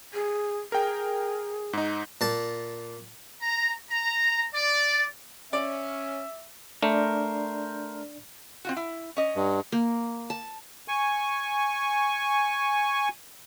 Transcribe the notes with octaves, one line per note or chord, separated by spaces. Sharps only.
G#4
G#4 A#4 G5
G#2 D#4
A#2 A5
A#5
A#5
D5
C#4 D5 E5
A3 D4 A#4 C5 D5
C4 F4 F#4
E4
C#4 D#5
G2
A#3
A5
G#5 C#6